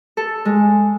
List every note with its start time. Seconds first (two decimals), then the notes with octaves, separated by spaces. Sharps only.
0.17 A4
0.45 G#3